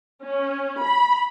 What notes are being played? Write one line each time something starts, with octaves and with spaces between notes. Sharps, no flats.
C#4
B5